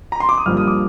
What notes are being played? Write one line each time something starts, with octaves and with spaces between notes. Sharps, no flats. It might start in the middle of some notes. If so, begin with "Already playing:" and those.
A#5
C6
D6
D#6
G2 F3 A#3 F6
D#6
D6